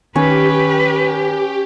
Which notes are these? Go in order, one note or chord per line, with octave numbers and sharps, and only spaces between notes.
D#3 C#4 G4 B4